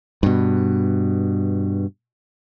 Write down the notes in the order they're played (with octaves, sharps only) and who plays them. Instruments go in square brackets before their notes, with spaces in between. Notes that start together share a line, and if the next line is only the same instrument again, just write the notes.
[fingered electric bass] G2 B2